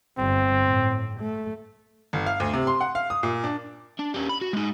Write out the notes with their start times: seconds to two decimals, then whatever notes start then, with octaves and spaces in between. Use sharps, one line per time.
0.18 G1 C4
0.65 A2
1.20 A3
2.13 G1
2.26 F5
2.40 D2
2.53 C3
2.67 C6
2.81 F#5
2.95 F5
3.10 D#6
3.23 A#2
3.44 D4
3.99 D4
4.14 G3 C#4
4.29 B5
4.42 F#4
4.53 G#3 D#4